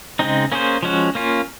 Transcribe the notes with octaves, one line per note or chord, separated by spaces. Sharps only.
C#3 G#3 C4 D#4
A#3 C#4 G#4 C5
F3 G#3 C#4 F#4
A#3 C#4 F4